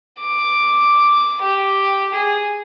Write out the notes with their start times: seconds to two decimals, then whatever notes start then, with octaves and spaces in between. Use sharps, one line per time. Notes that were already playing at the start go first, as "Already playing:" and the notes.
0.20 D6
1.41 G4
2.14 G#4